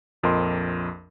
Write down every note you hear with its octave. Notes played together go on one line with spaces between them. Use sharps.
A#1 F2 A#4 D#5 C6